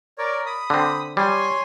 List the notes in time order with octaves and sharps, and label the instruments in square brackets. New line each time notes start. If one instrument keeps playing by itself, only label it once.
[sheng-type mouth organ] A#4 C#5 D5
B5 D#6
[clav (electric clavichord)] D3 C4
[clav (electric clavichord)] G3 [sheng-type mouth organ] C#5 G#5 C6